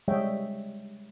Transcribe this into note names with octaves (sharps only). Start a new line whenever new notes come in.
G3 G#3 C#5 D#5 E5 G5